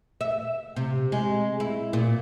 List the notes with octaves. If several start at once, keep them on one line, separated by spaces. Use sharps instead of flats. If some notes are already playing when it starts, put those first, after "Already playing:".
E5
C3
G#3
E4
A#2